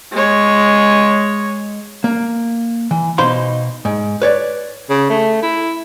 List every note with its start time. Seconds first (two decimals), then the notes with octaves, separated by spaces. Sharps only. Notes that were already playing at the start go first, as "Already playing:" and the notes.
0.12 G#3 C#5
2.04 A#3
2.91 E3
3.18 B2 D#4 C5 F5 B5 C6
3.85 G#2
4.22 B4 C#5 D5
4.90 C#3
5.10 A3
5.42 E4